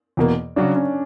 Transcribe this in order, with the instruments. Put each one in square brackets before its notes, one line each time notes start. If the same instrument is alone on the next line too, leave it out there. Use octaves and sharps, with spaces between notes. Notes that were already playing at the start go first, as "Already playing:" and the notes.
[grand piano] E2 B2 A#3
[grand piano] C#3 F#3 C#4 F#4 [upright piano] D4
[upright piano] C#4